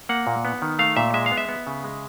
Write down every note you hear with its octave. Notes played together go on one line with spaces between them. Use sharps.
A#3 F#5
A#2
B3
D#3
A3 F5
A#2 E5
G#3 E5
F5
B3
E5
B3
C#3
G#3